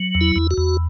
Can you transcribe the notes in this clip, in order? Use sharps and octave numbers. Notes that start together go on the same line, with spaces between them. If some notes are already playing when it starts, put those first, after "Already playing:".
Already playing: F#3
E2
E4
E2
F#4
E2